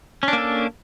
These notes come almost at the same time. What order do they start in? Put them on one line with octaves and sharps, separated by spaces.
C#4 D4 A#3 A4